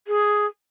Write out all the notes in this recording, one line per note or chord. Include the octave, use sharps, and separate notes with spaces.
G#4